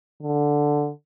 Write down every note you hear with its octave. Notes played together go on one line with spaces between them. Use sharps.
D3